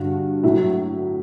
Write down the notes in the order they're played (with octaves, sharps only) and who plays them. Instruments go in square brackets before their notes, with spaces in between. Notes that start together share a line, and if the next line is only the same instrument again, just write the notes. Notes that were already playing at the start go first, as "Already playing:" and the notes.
Already playing: [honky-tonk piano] G2 D3 G3 F#4
A2 F#3 E4